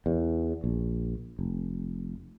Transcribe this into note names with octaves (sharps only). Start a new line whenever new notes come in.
E2
A#1
F1